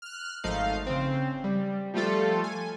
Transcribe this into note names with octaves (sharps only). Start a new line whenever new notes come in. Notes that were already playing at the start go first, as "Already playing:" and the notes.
F6 F#6
G#1 F3 A3 D#4 F5
C#3 C4
G3
F3 G3 A3 F4 A4
G#5